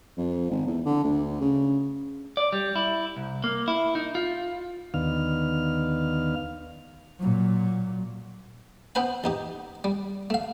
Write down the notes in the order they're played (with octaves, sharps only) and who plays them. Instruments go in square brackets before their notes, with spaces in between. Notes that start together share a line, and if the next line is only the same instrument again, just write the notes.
[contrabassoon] F2
G#1
E2
D3
D2
C#3
[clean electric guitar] D5
G3
E4
C2
A#3
E4
D#4
F4
[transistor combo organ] D#2 D3 D#3 B3 F5 F6
[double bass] A#2 F#3
[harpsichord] B3 C4 B4 C5 G#5 B5
A1 D#4 G4
G3
A3 F5